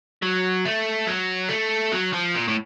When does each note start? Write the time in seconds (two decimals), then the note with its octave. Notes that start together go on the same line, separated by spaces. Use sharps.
0.22 F#3
0.65 A3
1.07 F#3
1.49 A3
1.92 F#3
2.13 F3
2.35 A#2
2.48 A2